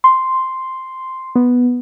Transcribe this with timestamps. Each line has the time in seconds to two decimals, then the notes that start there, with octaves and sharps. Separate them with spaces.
0.04 C6
1.35 B3